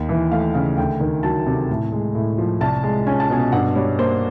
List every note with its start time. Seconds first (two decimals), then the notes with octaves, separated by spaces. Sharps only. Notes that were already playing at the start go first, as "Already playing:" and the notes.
Already playing: D#2
0.09 E3
0.32 A3 F5
0.54 C#3 F5
0.77 D2 G5
1.00 D#3
1.23 F#3 A5
1.46 C3
1.69 A2
1.92 G#3
2.15 A2
2.38 F3
2.61 C2 A5
2.83 G#3
3.06 C#4 G#5
3.20 A5
3.30 B2 G#5
3.52 G2 F#5
3.75 G3 C#5
3.98 A#3 C5